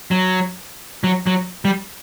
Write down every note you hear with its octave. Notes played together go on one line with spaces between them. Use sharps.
F#3
F#3
F#3
G3